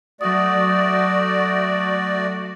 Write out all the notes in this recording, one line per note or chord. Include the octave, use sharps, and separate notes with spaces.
F#3 A3 F#4 D5 D#6